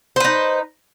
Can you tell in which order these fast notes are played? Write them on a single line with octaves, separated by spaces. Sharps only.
C5 B4 D#4